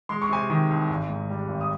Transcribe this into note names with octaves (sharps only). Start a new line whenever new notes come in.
G#3 C6
C#6
C3 G#5 C6
D#3
C2
G#1
G#2
G3
G#1
D#6